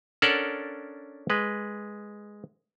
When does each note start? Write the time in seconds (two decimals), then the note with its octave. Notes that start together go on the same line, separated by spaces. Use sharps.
0.22 C#4 D4 A4 A#4 D5 F#5
1.30 G#3 B4